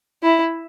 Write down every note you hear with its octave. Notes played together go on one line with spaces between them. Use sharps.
E4